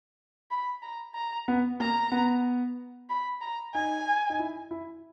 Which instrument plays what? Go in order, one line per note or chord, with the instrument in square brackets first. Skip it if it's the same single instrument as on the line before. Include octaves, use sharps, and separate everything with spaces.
[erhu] B5
A#5
A#5
[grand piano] B3
[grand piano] A#3 [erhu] A#5
[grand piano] B3
[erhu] B5
A#5
[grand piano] D#4 [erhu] G#5
[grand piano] D#4
E4
E4